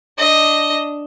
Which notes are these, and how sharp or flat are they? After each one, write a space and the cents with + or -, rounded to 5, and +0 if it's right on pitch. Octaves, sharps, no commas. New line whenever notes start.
D4 +0 D#5 +0